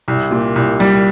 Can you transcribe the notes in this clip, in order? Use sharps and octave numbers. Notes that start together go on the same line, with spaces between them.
C2
A#2
C2
G3